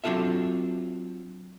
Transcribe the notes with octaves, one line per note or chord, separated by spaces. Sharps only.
F#3 C4 D4 F4 A4 E5